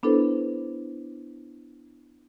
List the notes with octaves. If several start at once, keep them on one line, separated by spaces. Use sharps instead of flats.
B3 D4 E4 A4 B4 C5